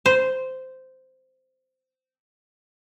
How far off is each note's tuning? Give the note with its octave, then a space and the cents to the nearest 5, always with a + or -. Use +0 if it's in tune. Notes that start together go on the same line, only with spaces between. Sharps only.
C5 -10